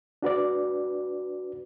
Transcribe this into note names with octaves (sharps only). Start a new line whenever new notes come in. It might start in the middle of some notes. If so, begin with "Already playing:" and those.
D4 F#4 B4 D5